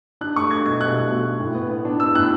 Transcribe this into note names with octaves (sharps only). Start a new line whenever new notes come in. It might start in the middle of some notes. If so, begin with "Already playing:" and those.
D4 F#6
A3 C#6
A3 G#6
B2 G#6
B2 F#6
B2
A3
A3
A2
B3
B3
D4
B3 E6
A2 F#6